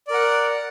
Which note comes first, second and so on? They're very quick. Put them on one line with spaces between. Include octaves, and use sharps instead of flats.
D5 A#4 F#5